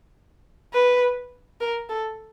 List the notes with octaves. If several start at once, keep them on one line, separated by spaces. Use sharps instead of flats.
B4
A#4
A4